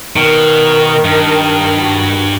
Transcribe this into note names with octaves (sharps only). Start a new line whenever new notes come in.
B2 D#3 A#4
G2
F#4